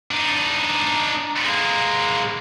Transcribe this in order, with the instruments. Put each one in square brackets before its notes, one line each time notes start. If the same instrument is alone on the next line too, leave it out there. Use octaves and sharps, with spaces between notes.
[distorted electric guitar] D4 D#4
G#3 A#3